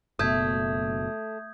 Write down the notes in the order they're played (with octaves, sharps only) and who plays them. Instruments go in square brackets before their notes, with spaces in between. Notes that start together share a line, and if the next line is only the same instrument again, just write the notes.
[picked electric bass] F#1 B2 [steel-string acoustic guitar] A3 [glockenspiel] D#6 G6 G#6